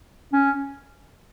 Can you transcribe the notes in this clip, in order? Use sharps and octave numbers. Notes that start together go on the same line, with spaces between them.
C#4